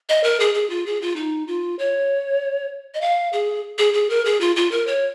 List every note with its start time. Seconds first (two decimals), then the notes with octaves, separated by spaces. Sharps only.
0.09 D#5
0.24 A#4
0.40 G#4
0.55 G#4
0.70 F4
0.86 G#4
1.02 F4
1.16 D#4
1.48 F4
1.79 C#5
2.94 D#5
3.01 F5
3.33 G#4
3.78 G#4
3.94 G#4
4.10 A#4
4.25 G#4
4.41 F4
4.56 F4
4.71 A#4
4.87 C#5